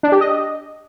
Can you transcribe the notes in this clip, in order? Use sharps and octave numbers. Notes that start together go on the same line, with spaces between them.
D4
G4
D#5